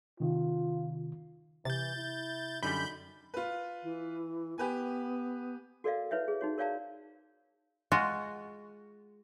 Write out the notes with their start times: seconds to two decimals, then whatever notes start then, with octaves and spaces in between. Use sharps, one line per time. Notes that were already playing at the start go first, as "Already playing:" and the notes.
0.20 C3 D#3 F4
1.65 C3 E3 G6 A6
1.97 E4
2.62 F#2 D3 G3 D#4 B5 G6
3.34 F4 B4
3.83 E3
4.58 B3 G4 B4 G#5
5.84 F#4 A4 A#4 D5 D#5 F5
6.11 E4 B4 C#5 E5
6.28 G#4
6.41 D#4 F#4 C#5
6.58 A#4 C#5 D5 F5 A5 A#5
7.92 G#3 F4 F#4